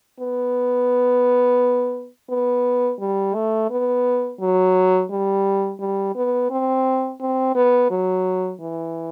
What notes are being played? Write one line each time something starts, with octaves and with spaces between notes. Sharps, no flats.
B3
B3
G3
A3
B3
F#3
G3
G3
B3
C4
C4
B3
F#3
E3